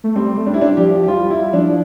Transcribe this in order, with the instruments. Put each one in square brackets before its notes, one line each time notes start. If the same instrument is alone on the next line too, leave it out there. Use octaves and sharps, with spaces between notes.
[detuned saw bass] A3
[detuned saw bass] G3 [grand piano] C4
[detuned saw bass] A3
[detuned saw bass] G3 [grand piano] D4
[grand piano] E4
D4
[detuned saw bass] F3 [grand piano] G4
[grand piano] G4
[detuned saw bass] G3 [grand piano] F4
[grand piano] E4
[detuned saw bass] F3 [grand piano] D4